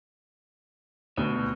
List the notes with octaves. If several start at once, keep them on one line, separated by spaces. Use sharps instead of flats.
D2 B2